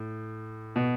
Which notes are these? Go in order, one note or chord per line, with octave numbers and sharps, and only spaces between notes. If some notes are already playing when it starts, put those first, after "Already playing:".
Already playing: A2
B2